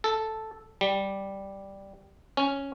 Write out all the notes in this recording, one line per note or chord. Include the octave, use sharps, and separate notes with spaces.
A4
G3
C#4